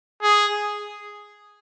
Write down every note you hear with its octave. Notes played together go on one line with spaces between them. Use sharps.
G#4